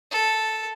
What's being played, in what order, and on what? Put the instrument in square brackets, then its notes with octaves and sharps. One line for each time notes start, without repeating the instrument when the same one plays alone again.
[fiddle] A4